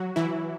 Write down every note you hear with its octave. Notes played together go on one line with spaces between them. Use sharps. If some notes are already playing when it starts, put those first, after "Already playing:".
Already playing: F#3 F#4
E3 E4